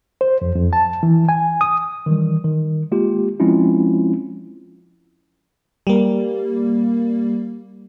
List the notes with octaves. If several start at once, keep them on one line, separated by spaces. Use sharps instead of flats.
C5
F2
F2
A5
E3
G#5
D#6
D#3 E3 G3
D#3
G#3 A#3 F4 G4
F3 G#3 C4 C#4 E4 F4
G3 A#3